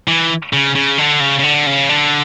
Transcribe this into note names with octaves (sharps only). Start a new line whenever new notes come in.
E3
C#3
C#3
D3
C#3
C#3
D3
C#3
D3